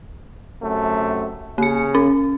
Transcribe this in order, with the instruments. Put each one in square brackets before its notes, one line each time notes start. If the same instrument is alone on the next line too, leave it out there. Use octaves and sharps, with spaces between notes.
[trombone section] F#2 C3 A3
[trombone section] C#3 [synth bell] A#3 C#7
[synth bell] C#4